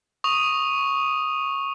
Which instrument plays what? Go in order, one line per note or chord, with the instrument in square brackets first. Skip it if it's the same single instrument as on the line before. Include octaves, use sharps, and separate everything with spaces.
[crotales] C#6 D#6 F7